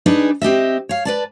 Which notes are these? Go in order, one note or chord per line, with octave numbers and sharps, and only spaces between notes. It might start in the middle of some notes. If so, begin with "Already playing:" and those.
D4 D#4 G#4 B4 D5
C4 G4 D#5 E5
C#5 F5
B4 D5 A5